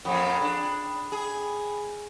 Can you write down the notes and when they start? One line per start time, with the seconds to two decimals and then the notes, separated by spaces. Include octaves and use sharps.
0.05 F2 A#2 C#3 G5 B5 D#6
0.42 D4
1.12 G#4